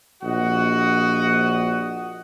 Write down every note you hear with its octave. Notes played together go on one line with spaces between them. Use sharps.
A#1 F#4 D#5 F#5